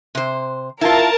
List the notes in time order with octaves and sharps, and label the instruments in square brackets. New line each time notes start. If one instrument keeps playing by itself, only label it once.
[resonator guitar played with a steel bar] C3 C5
[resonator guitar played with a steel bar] E4 F4 [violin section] A#4 A5